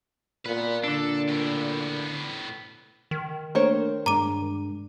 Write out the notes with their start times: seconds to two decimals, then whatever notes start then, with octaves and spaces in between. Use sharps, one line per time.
0.46 A#2 B4 F#5
0.84 A#2 D3 D4 A4
1.28 A2 B3
3.11 D#3
3.55 A3 A#3 D4 A#4 C5 C#5
4.06 G2 G#3 D4 A#5 D6 D#7